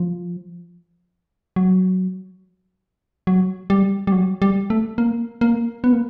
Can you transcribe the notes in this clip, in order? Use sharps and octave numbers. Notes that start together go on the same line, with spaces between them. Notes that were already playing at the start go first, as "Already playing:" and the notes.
Already playing: F3
F#3
F#3
G3
G3
F#3
G3
A3
A#3
A#3
B3
A#3